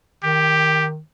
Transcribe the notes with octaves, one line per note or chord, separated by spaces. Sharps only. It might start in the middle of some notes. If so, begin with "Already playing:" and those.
D#3 G4